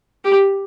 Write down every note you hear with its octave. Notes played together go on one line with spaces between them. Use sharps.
G4